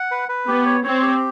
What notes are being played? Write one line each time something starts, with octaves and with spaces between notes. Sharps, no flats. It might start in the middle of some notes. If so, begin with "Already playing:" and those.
Already playing: F#5
B4
B4
B3 G4
C#5
C4 C#5
G4